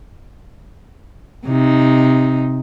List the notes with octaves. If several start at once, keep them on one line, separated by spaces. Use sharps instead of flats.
C3 D#4